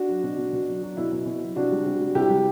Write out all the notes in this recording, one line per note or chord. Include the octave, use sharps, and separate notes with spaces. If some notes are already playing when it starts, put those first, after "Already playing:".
Already playing: D4 F#4
F#3
B2
B2
B2
F#3
F#3
B2 E4
B2
B2
F#3
C3 D4 F#4
G3
C3
G3
C3 E4 G4
G3